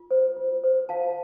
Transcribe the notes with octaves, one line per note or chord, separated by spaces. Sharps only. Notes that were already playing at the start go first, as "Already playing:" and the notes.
Already playing: F4
C5
F4
C5
F4 F5 A5